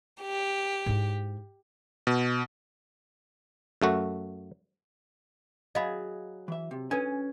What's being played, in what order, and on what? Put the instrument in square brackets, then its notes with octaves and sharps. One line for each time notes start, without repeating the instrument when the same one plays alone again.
[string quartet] G4
[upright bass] G#2 E4
[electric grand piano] B2
[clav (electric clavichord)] F#2 A3 F#4
[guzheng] F#3 G#4 [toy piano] D#5 F5 B5
[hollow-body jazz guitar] E3 E5
C3
[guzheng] C#4 [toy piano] D4 A4 [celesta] B4 G#6 [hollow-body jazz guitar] G#5